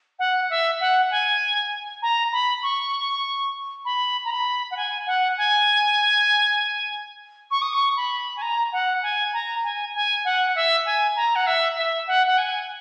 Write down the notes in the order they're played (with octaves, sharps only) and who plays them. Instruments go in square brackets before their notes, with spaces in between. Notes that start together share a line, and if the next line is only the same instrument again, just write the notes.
[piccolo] F#5
E5
F#5
G#5
A#5
B5
C#6
B5
A#5
B5
F#5
G#5
F#5
G#5
C#6
D#6
C#6
B5
G#5
A#5
F#5
G#5
A#5
G#5
G#5
F#5
E5
G#5
A#5
F#5
E5
E5
F#5
F#5
G#5